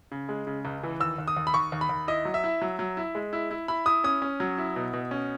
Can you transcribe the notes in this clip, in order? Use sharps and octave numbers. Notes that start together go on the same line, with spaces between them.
C#3
G#3
C#3
C#2
E3
D#2 E6
D#2
D#6
D#2
B5
D#2 C#6
D#2
B5
D#2
E4 D#5
F#3
E5
E4
F#3
F#3
E4
G#3
E4
E4
E4 B5
E4 D#6
C#4 D#6
C#4
F#3
E4
B2
B2
C#4